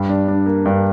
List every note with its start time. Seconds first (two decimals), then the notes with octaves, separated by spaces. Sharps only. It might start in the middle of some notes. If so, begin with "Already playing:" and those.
Already playing: G2 G3
0.09 D4
0.28 D4
0.46 A#3
0.66 G2